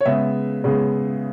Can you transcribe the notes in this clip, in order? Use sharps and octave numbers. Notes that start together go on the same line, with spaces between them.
C#5
C#3 G#3 B3 E5
C#3 G#3 B3